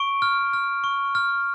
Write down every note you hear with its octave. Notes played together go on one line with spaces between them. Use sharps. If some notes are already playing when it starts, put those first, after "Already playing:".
Already playing: C#6 D7
F6
F6
C#6
F6